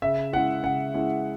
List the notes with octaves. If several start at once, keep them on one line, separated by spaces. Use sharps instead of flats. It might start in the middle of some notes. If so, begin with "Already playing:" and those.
C#3 E5
G#3 C#4 E4 F#5
C#3 F#5
G#3 C#4 E4